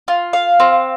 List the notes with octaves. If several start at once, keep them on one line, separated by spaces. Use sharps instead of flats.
F4
F5
C4